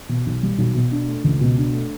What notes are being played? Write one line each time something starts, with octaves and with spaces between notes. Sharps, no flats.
B2
B1
G3
B1
B2
D4
A3
C#2
B2
D4
A3